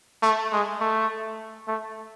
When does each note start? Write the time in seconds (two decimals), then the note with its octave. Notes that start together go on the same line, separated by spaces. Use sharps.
0.23 A3
0.53 G#3
0.81 A3
1.68 A3